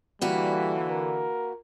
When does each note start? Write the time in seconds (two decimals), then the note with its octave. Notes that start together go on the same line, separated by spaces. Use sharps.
0.22 D3 E3 G3 A#3 F#4 B4
0.90 A#4